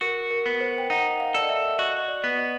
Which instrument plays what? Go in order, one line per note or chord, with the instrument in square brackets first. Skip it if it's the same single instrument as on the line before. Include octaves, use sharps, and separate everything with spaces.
[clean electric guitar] F#4 [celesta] A#4
[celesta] A#4
[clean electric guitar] B3
[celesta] C5
G5
[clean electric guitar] D#4 [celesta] F#5
[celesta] F5
[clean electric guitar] A4 [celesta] D5
[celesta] D#5
E5
[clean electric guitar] F#4 [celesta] D#5
[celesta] D#5
D5
[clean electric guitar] B3
[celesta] D#5